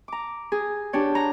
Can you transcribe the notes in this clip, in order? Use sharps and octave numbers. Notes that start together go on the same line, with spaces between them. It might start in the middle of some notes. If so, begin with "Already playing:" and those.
A#5 D6
G#4
D4 G4 C#5
A#5